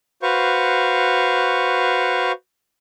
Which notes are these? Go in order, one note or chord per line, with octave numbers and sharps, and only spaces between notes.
F#4 B4 C5 F5 C#6